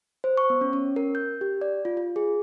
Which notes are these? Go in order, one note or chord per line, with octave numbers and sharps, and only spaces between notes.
C5
C#6
B3
C#4
C#4
A#4
G6
G4
D5
F4
F4
G#4